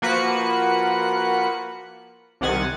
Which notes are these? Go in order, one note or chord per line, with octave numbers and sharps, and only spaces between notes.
F3 A#3 F#4 B4 F#6 C#7
C2 C3 D#3 F#5 G#5 A6